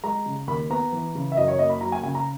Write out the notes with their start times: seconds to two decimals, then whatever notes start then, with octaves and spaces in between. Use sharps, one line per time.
0.03 G#3 A#5
0.26 C#3
0.47 D#2 B5
0.70 B3 A#5
0.92 E3
1.15 C#3
1.32 E5
1.37 F#2 D#5
1.48 C#5
1.59 A#3 D#5
1.70 B5
1.81 F#3 A#5
1.92 G#5
2.03 C#3 G#5
2.15 A#5